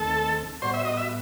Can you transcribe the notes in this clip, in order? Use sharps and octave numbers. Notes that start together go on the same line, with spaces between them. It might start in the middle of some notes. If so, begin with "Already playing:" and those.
Already playing: D#2 D#3 A3 C4 A4
A2 G3 B3 F#4 C5
E5
D#5
E5